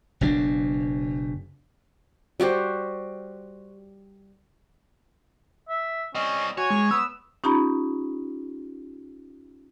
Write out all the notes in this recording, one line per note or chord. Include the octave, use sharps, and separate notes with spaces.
F#1 B2 C4 D4
G3 F#4 G4 C5
E5
G3 C4 C#4 D#5
F#4 C#5 G#5
G#3
B3 E6
C#4 D#4 F4 G4 A#5 B5